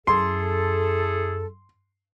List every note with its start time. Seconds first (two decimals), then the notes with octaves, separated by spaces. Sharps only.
0.07 F#2 E4 G#4 A4 C6